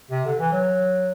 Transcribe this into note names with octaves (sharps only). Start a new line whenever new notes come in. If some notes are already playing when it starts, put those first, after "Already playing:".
C3
D3
E3
F#3